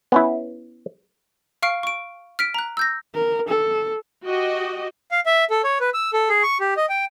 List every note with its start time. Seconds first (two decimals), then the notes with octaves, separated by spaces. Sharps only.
0.12 B3 C#4 E4
1.62 F5 C#6 F6 C7 D7
1.83 C#6 D7
2.39 F6 B6 D7
2.54 A#5 F#6
2.77 E6 G6 A#6
3.14 A#4
3.48 A4
4.25 F#4 G4 D#5
5.11 F5
5.26 E5
5.50 A4
5.64 C#5
5.80 B4
5.94 E6
6.13 A4
6.29 G#4
6.43 C#6
6.60 G4
6.77 D#5
6.89 G5